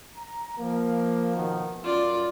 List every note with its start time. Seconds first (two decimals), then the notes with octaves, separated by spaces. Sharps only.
0.16 A#5
0.58 F3 A#3
1.36 B2 D#3 F#4
1.83 F#2 F4 D5